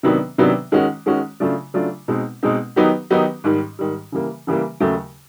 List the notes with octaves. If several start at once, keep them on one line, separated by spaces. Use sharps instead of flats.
C3 D#3 F#3 B3 D4
C3 D#3 F#3 B3 D4
D#3 G#3 C#4 F#4
D#3 G#3 C#4 F#4
C#3 F#3 A3 D4 F4
C#3 F#3 A3 D4 F4
B2 G#3 C4 D#4
B2 G#3 C4 D#4
D#3 F#3 B3 D#4 G4
D#3 F#3 B3 D#4 G4
G#2 D#3 G3
G#2 D#3 G3
C#3 E3 G3 A#3
C#3 E3 G3 A#3
D#2 C#3 F#3 A3